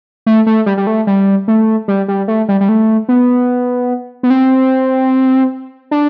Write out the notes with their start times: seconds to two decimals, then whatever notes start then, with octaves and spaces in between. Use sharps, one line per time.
0.26 A3
0.46 A3
0.66 G3
0.77 G3
0.87 A3
1.07 G3
1.48 A3
1.88 G3
2.08 G3
2.28 A3
2.49 G3
2.61 G3
2.69 A3
3.09 B3
4.23 B3
4.30 C4
5.91 D4